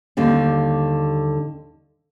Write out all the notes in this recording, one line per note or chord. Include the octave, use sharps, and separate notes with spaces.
D#2 D3 G3